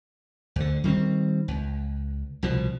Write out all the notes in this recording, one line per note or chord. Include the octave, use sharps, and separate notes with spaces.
D2 D3
D#3 G3 B3 C4
C#2
C2 B2 F3